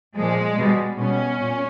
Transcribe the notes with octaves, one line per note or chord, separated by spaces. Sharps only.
A#2 F3 G#3
B2 G3
B2 G3 C#4
A#2